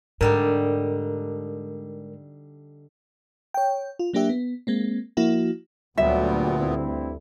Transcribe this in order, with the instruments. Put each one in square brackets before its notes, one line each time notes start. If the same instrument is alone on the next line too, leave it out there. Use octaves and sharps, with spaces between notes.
[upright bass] G#2 [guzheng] D3 G3 D#4 [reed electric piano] A#4
[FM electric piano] C#5 G5
F4
F#3 A#3 D4 G4 E5
B3
G#3 A#3 C4
F3 A#3 E4 F#4
[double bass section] D2 [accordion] A#2 B3 [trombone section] F#3 G3 [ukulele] E5
[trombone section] G2 C4 E4